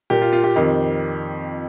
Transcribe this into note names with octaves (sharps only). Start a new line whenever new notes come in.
A#2 A#3 G4
F4
F4
G4
F2 D#3 C4